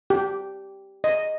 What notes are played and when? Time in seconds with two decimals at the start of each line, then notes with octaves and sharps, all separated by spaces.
0.10 G4
1.04 D#5